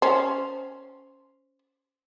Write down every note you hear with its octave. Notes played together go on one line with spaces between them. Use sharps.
C#4 C5